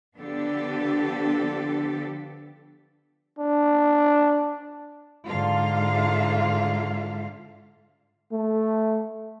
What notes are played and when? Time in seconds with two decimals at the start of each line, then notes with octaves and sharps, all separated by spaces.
0.17 D3 F3 B3 D4 G4 A4
3.39 D4
5.27 G#2 D3 F4 F5
8.32 A3